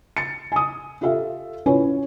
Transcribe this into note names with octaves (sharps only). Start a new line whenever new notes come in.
A6 C#7
G#5 D#6
F4 G4 A4 E5 F5
C#4 E4 F4 B4 C#5 G#5